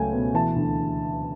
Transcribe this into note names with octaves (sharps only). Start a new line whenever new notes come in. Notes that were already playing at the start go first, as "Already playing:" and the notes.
Already playing: C#2 F#3 A3 G5 G#5
B2
E3 A5
D2